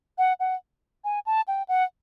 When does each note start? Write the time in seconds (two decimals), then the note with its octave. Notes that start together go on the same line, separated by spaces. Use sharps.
0.18 F#5
0.40 F#5
1.04 G#5
1.26 A5
1.48 G5
1.69 F#5